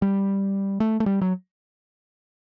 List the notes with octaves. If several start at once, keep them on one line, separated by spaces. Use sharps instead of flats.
G3
A3
A3
G3
F#3